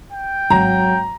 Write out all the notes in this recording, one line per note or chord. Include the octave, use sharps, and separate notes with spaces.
G5
G#1 F#3 A#5